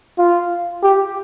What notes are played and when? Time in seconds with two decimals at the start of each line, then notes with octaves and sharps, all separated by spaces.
0.18 F4
0.83 G4